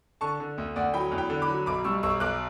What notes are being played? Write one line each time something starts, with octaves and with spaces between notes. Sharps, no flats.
D3 A5 C#6
D3
D2
D2 D5 F#5
F#3 G5 B5
E2
G5 B5
D3
B5 D6
F#3
B1 B5 D6
G3 C#6 E6
B1 C#6 E6
B1 D6 F#6